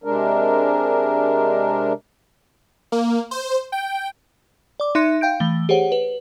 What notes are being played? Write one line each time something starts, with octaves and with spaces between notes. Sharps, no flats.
C3 G#3 D4 A#4
A#3
C5
G5
D5 D6
D#4 E5 C6 F#6 A#6 C#7
F5 G5 G6 D7
E3 A3 G7
G4 G#4 C5 C#5 F#5
B4